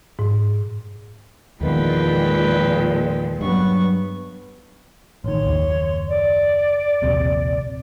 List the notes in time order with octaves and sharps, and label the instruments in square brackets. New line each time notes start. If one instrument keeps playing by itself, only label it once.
[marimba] G#2
[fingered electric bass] E2 D#3 B3 [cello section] A#2 F3 G#3 [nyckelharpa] B4 G5
[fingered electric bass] G2 F#3 [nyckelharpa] B3 C#6
[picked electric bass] A1 D#3 [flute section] C#5 C6
[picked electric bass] F#1 D#2
[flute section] D5
[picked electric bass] D#1 A#1 C3